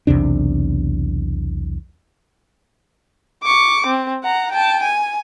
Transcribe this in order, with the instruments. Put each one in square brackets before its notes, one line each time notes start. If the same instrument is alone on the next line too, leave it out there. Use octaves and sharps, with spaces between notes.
[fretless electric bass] B1 E2 C3 D4
[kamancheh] C#6 D6
C4
F#5 A#5
G5 A5
G#5